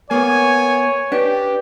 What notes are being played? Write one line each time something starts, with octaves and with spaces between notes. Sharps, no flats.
A#3 B3 C#5 G#5
D4 G4 B4